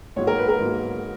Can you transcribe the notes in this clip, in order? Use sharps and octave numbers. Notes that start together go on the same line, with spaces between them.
G#2 F#3 A#3 C#5
A#4
B4
A#4
G#2 F#3 A#3